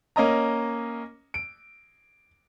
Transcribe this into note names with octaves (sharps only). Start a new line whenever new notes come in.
A#3 C#4 D#5 A#5
D7